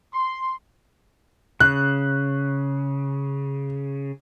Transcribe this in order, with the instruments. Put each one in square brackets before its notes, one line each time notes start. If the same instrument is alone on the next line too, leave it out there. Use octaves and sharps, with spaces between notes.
[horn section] C6
[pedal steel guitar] C#3 [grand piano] F#6